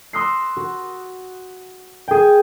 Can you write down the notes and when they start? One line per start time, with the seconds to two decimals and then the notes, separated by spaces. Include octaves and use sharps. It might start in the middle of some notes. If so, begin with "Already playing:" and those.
0.13 C6 D#6 E6 F#6 A#6 C7
0.57 F#4
2.08 G#4 G5